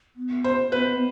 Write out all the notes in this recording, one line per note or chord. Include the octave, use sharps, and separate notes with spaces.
B3
C5
B4